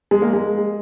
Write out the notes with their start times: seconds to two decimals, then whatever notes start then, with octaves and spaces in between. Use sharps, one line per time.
0.11 G#3
0.22 A#3
0.33 G#3